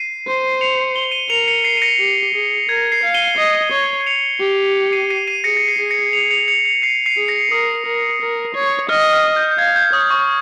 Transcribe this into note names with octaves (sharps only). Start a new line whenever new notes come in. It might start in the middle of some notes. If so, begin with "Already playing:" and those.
Already playing: C7 D#7
C5
C#7 F7
G7
F7
D#7 G7
A#4 C#7 F7
C#7 F7
C7 D#7
D#7
A#6 C#7
G4
G#4
A#4 G#6
C7
F5
D#7 G7
D#5
C#5
C#7 F7
G4
C7 D#7
C7 D#7
C7 D#7
G#4 A#6 C#7
A#6
C7
G#4
A#6 C#7
C#7 F7
C#7 F7
C#7 F7
C#7 F7
C7 D#7
C7 D#7
G#4
A#6 C#7
A#4 D#6
A#4
A#4
C#5
D#5 F6
F6
G6
G6
F5 G#6
G6
C#5 D#6
C#6